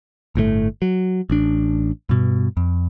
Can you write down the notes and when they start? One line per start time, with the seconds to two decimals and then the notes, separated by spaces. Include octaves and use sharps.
0.35 G1 A2 D3 A3
0.82 F#3
1.30 A1 D4
2.09 G2 B2
2.57 F2